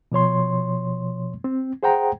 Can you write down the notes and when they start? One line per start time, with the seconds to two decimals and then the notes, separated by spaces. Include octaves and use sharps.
0.12 B2 F3 C#5 C6
1.44 C4
1.83 G#4 C5 F#5 G5 A#5